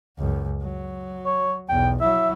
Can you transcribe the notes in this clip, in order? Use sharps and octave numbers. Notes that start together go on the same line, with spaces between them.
C#2 F#2
F#3
C#5
B1 E2 G5
F#3 E4 E5